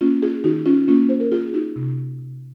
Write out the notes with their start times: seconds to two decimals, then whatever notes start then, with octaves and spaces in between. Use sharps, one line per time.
0.01 A#3 C#4 F4
0.22 F4 G#4
0.44 D#3 D#4 F#4
0.66 C#4 F4
0.88 A#3 C#4 F4
1.09 C5
1.20 A#4
1.32 A#3 F4 G#4
1.53 D#4 F#4
1.76 C3
2.19 C3